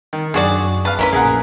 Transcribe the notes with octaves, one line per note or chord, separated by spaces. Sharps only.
D#3
F#2 D4 F#4 G#4 D5
B4 F5 A5
E3 A3 C#4 A#4 B4
A#1 G#4 A#4 F#5